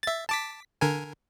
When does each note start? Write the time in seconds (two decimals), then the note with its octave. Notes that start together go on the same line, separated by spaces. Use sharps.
0.03 E5 A6
0.29 A5 D6 B6
0.81 D3 A#4 G#5